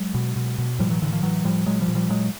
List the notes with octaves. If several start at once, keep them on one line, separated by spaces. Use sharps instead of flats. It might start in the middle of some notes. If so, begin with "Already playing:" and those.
Already playing: F#3 G#3
B2
B2
B2
A2 F3 G3
E3 F#3
A2 D3 E3
D#3 F3
A2 E3 F#3
A2 F3 G3
A#2 F#3 G#3
F3 G3
A#2
F3 G3
A#2 F#3 G#3